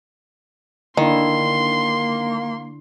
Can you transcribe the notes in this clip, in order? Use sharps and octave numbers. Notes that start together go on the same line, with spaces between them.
D3 D#3 A#3 D4 E4 C6